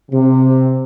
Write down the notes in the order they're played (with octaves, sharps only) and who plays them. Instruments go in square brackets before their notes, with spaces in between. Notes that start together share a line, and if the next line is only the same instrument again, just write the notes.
[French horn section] C3